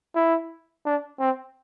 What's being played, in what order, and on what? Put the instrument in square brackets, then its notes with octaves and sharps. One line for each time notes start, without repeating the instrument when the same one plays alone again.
[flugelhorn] E4
D4
C4